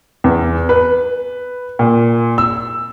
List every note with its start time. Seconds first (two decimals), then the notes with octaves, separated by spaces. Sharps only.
0.24 E2
0.69 B4
1.79 A#2
2.38 E6